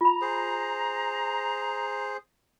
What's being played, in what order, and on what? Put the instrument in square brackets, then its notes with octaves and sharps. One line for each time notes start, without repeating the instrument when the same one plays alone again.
[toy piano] F4 B5 [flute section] A#5
[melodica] G#4 C5